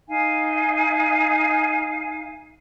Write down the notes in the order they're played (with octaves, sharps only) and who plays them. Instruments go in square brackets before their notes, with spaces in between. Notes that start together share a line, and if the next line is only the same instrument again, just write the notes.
[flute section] D#4 F5 G#5